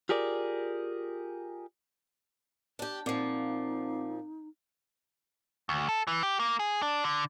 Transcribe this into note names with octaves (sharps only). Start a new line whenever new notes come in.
F4 G4 G#4 A#4 D5
D4 G4
A#2 F3 C4 D#4 D6 C7
D2
A4
E3
G4
A#3
G#4
D4
D3